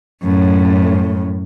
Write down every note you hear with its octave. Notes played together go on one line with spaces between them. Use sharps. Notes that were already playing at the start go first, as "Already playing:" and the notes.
F#2 A2